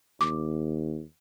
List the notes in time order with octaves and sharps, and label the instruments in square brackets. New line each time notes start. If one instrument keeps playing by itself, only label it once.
[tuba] D#2 [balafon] D6